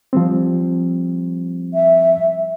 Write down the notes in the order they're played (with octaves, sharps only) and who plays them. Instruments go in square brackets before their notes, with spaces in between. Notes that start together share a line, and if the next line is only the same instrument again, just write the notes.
[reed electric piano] F3 G3 C4
[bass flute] E5